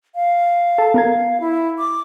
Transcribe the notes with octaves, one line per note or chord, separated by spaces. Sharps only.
F5
A4 A5
B3 A#4 G#6
E4
D6